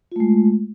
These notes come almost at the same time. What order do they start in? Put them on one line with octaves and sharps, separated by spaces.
F4 A3 G#3